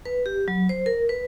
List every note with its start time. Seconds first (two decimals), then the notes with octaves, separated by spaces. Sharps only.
0.05 B4
0.26 G4
0.48 F#3
0.69 C5
0.86 A#4
1.09 B4